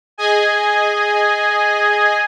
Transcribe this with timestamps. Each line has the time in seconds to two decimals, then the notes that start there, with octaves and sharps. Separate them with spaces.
0.18 G#4 D#5 G#5